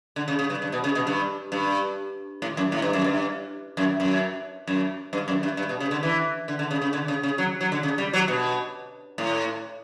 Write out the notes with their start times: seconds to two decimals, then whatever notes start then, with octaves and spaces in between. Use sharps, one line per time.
0.16 D3
0.28 C#3
0.39 C#3
0.50 G2
0.62 G2
0.72 B2
0.84 C#3
0.95 B2
1.07 G2
1.52 G2
2.42 A2
2.57 F#2
2.72 A2
2.82 G2
2.93 F#2
3.04 G2
3.77 F#2
4.00 F#2
4.67 F#2
5.13 G2
5.28 F#2
5.43 G2
5.57 G2
5.69 B2
5.80 C#3
5.91 D3
6.03 E3
6.48 D3
6.59 D3
6.71 C#3
6.82 C#3
6.93 D3
7.08 C#3
7.23 C#3
7.38 F#3
7.61 F#3
7.72 D3
7.83 C#3
7.98 G3
8.13 F#3
8.28 B2
9.18 A2